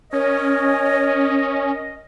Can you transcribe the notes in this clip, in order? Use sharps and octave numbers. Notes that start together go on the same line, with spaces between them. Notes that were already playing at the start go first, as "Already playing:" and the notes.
C#4 A#4 C#5 D#5